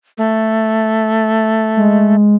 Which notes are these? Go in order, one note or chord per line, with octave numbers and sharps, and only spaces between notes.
A3
G#3